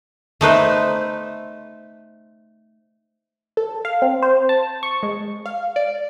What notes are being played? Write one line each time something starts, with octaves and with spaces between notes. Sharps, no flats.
A3 D#4 B4 C5
A4
F5
C4
C5
A5
C#6
G#3
F5
D5